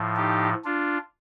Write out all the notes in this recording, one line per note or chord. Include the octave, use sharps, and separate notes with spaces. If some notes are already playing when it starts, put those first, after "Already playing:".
Already playing: A2 F3
D#4 G4
D4 F4